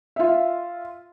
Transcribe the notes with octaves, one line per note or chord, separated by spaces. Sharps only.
F4 E5